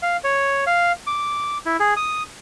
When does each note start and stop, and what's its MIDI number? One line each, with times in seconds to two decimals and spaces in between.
0.02 0.17 77
0.24 0.64 73
0.67 0.92 77
1.07 1.58 86
1.66 1.77 64
1.80 1.94 68
1.96 2.23 87